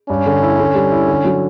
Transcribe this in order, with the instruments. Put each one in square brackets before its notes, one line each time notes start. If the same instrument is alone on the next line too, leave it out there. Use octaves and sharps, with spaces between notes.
[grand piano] G2 [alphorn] C#4
[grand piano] D3
E4
D3
G3
E4
D3
F#3